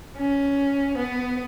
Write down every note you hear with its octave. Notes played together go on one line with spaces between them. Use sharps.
C#4
B3